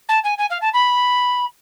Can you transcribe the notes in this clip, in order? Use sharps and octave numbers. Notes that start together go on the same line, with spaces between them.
A5
G#5
G#5
F5
A5
B5